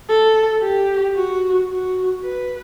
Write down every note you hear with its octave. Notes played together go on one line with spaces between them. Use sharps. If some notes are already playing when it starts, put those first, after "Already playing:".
A4
G4
F#4
F#4
B4